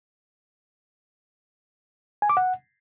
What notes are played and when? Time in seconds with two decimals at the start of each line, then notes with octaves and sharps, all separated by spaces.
2.22 G#5
2.30 D6
2.37 F#5